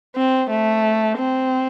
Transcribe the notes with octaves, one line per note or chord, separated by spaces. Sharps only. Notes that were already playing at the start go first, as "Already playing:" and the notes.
C4
A3
C4